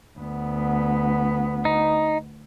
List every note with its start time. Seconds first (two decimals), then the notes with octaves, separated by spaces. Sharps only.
0.19 D2 B3
1.65 D#4